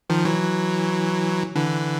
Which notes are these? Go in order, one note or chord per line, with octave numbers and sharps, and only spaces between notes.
D#3 F3
E3 F#3
D3 E3